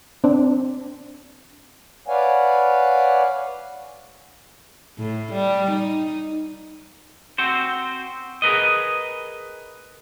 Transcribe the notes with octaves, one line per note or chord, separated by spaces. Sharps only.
C4 D4
B4 C#5 D5 F5 F#5 G#5
A2
G3
D#4
C4 F#4 C5
G#4 A#4 B4 D#5